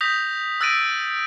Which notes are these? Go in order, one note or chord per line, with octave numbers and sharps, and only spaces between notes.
D#6 G6 A#6 B6 F7
E6 F#6 A6 A#6 D7 D#7